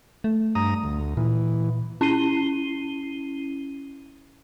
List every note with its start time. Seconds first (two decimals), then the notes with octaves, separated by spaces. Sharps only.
0.24 A3
0.55 G2 A#5 D#6
0.84 D2
1.17 A#2 E3
2.01 C#4 E4 C7 D#7 G7